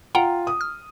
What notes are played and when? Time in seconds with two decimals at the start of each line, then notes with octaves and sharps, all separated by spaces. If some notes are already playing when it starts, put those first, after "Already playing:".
0.15 F4 F#5 G5 A#5
0.47 D#6
0.61 F6